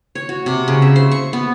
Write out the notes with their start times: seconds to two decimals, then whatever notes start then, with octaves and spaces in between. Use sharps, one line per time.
0.15 C#5
0.29 F#4
0.46 C3
0.68 C#3
0.82 E5
0.96 C5
1.11 C#6
1.33 B3